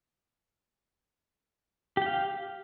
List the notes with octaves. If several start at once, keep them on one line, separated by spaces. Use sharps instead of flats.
G4 F5 G5